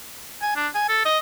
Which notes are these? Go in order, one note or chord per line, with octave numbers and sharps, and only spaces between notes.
G#5
D4
G#5
A4
D#5